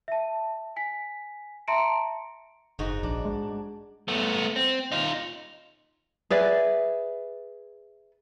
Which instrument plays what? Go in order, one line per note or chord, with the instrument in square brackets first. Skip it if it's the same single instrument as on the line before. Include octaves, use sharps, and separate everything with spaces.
[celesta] E5 A5
G#5 B6
E5 A5 A#5 C6 C#7 D7
[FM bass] F#1 [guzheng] G#2 D#4 F#4
[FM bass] A#1 [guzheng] D4
[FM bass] G#3
[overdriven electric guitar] A3 B3
C4
D#4 F4
[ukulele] G#4 B4 D5 E5